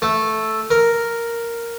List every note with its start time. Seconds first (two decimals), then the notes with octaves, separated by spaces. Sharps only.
0.02 A3
0.70 A#4